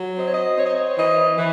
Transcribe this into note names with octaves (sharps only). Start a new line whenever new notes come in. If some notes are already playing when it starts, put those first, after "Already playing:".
Already playing: F#3
C4 D#5
C#5
D#5
C4 C#5
D#5
C#5
E3 D#5
E3